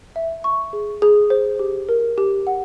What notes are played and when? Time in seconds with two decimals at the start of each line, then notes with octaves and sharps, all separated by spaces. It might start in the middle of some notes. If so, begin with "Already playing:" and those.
0.16 E5
0.44 C#6
0.73 G#4
1.02 G#4
1.30 C5
1.59 G4
1.89 A#4
2.18 G4
2.47 F#5